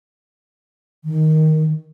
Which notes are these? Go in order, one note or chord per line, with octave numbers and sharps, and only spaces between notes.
D#3